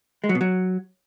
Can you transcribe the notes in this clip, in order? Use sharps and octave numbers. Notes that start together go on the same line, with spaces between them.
G#3
F#3
B2
F#3